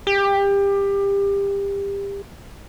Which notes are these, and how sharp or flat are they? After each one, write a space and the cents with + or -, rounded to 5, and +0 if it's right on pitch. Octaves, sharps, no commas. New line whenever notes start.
G4 +25